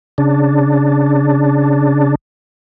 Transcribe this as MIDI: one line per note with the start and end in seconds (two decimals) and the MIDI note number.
0.18 2.15 49
0.18 2.15 62